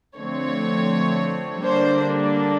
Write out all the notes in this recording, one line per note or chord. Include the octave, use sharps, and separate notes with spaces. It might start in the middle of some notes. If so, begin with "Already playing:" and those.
D3 F3 A3 C4 C#5
D3 G3 A#3 D4 C5